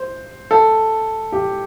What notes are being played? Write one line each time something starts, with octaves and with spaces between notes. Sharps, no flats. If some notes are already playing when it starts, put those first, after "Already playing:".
Already playing: C5
A4
G4